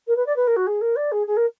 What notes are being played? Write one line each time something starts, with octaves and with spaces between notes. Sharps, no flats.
A#4
B4
D5
B4
A#4
F#4
G#4
A#4
D5
G#4
G#4
A#4